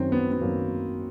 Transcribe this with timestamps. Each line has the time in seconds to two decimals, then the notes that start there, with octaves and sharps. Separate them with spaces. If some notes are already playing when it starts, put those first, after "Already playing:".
Already playing: F#2 D#3 F#3 C4
0.12 B3
0.32 B3
0.41 F#2 D#3 F#3 A#3